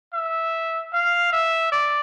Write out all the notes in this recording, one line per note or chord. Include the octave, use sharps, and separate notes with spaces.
E5
F5
E5
D5